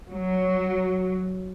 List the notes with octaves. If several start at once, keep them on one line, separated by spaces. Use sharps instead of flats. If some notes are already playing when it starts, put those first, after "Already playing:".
F#3